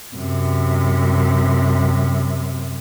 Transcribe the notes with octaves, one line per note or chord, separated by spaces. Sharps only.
F#2 C3